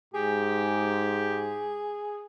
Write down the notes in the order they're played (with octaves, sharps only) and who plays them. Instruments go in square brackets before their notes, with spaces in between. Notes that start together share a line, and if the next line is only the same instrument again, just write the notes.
[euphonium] G#2 [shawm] G4 [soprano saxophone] G#4